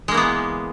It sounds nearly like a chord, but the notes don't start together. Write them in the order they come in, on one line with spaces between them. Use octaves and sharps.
G#3 A#3 E3 B3